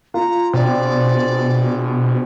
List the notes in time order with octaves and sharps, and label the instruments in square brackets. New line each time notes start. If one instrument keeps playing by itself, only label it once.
[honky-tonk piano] F4 [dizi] A#5
[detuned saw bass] B2 [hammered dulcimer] C4 D4 G#4 [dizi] D5